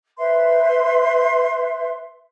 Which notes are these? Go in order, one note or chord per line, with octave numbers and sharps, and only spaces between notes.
B4 C5 E5 C6